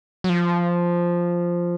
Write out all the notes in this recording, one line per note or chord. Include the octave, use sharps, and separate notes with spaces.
F#3
F3